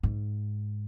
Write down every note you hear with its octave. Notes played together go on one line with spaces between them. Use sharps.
G#2